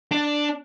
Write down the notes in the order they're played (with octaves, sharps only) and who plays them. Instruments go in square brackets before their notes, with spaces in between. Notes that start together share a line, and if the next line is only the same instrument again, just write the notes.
[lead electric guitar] D4